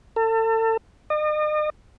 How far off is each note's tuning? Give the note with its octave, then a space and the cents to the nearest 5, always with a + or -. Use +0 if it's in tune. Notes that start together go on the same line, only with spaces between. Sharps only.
A4 +35
D#5 -40